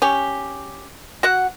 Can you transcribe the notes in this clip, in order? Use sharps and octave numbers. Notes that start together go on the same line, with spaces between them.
C#4 G4
F#4 F#5